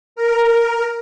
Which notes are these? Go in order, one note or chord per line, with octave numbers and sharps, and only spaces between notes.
A#4